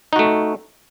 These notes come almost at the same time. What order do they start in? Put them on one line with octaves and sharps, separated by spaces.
D#4 F#4 A3